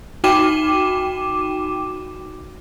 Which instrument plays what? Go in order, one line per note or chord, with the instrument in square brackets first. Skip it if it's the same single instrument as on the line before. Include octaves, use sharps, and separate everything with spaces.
[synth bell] D#4 F#4 G5 D6 D#7 E7